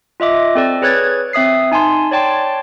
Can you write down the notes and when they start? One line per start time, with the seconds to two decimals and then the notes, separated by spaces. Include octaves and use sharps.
0.20 F4 D#5 E5 D6
0.55 C4 A4 D5
0.82 G#4 B4 C#5 F#6 G#6 A6
1.33 C4 E5 D#6 C7
1.72 D#4 G#5 A5 C6
2.11 C#5 D5 G5 A5 C6